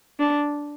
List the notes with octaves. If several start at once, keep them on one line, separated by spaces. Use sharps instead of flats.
D4